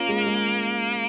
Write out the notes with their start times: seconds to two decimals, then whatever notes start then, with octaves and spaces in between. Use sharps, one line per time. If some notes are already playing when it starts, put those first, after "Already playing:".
Already playing: A#3 C#4 F4
0.09 G#3
0.27 G#3